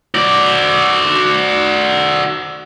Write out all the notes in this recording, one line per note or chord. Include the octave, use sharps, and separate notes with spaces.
F#4 D5